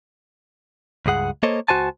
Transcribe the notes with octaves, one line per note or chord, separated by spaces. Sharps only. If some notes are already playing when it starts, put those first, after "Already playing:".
C#2 G2 G#4 F#5
A#3 A4 C5 C#5 D#5
C#2 G#2 F#4 C5 G#5 A5